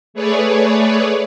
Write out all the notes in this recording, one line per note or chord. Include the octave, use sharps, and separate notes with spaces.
A3 G#4 B4 C#5 D5